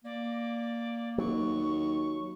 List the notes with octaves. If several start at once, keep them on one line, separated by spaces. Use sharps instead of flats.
A#3 D5
D#2 F#3 C#6